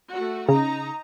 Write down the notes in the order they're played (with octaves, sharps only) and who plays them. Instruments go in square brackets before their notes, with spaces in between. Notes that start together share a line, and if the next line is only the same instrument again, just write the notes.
[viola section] A3 F#4
[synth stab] C#3 [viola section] D#4 A#5